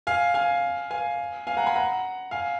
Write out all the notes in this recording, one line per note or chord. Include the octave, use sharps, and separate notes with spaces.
F5 G#5
F5 G#5
F5 G#5
F5 G#5
F#5 A#5
G#5 B5
F#5 A#5
F5 G#5